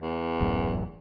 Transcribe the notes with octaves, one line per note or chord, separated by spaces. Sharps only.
E2
D1 A1 F#2